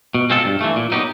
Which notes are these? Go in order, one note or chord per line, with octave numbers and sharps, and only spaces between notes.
B2
G#3 C4 F4 A4
G2
E3 A3
A#2
F#3 B3 D#4 G4